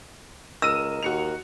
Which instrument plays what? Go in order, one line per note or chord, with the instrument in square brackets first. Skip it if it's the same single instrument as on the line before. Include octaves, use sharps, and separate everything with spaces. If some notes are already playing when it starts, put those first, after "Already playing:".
[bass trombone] C#2 [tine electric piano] A#4 D#5 A#5 [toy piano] E6 [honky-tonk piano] D#7 E7
[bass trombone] D#2 [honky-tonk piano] F#4 C#7 F7